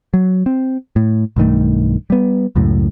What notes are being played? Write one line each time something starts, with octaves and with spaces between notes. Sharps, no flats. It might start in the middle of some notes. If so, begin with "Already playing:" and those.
F#3
C4
A2
B1 G2 D#3 A3
G3 B3
C#2 F#2 A2